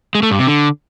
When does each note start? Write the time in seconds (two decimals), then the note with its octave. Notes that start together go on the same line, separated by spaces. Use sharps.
0.15 G#3
0.23 A3
0.31 G2
0.39 C3
0.47 D3